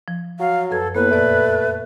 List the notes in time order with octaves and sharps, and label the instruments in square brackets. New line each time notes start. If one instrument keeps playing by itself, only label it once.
[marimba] F3
[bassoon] F#3 [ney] F5
[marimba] F#2 B4 G#6 [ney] A4
[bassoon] A2 [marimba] A#3 B3 [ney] B4
[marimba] F2 A#2 D5 [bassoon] A3